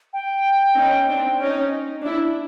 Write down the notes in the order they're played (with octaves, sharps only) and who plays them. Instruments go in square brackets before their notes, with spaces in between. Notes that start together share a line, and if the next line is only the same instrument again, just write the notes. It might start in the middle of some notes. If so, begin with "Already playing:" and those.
[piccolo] G5
[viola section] C#4 D#4
C4 D4
C#4 D#4
D4 E4